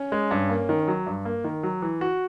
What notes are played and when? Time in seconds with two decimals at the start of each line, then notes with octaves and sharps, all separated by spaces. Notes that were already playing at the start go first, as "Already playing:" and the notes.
Already playing: C#4
0.12 G#3
0.31 G2
0.49 A#3
0.69 D#3
0.88 F#3
1.07 G2
1.25 A#3
1.44 D#3
1.63 F#3
1.82 E3
2.01 F#4